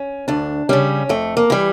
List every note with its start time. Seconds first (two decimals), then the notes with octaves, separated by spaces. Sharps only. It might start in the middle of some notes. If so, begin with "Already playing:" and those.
Already playing: C#4
0.28 D2 D4
0.69 C#3 G3 C#4
1.09 F2 A3
1.37 A#3
1.50 E3 G3